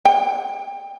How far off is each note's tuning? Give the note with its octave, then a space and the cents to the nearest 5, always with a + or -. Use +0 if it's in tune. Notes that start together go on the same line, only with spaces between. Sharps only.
G5 +20